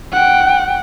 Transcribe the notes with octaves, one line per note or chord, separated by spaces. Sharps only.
F#5 G5